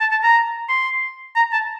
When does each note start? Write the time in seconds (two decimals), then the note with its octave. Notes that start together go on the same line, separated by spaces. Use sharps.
0.01 A5
0.11 A5
0.23 A#5
0.69 C6
1.36 A#5
1.53 A5